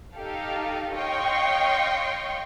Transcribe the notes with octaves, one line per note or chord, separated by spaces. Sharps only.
D#4 G4 A4 F5
C#5 D#5 F5 G5 C6 C#6